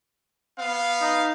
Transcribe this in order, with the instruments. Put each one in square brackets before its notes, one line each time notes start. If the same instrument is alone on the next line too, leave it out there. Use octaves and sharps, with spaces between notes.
[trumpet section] B3 F5
[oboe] D#4